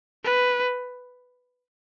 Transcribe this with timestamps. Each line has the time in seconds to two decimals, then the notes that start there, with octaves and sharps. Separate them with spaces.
0.24 B4